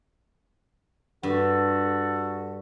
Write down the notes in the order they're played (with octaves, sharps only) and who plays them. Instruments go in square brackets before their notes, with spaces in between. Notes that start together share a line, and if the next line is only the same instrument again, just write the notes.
[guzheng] G2 [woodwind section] F#4 A4